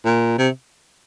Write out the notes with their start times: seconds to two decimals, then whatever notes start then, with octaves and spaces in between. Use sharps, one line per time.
0.05 A#2
0.38 C3